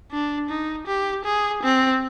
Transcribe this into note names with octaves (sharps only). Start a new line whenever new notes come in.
D4
D#4
G4
G#4
C4